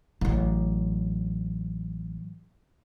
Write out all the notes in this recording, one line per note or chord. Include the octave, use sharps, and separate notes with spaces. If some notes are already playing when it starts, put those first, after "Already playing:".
A1 F#3